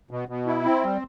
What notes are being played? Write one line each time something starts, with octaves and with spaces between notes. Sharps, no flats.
B2
B2
E4
C4
G3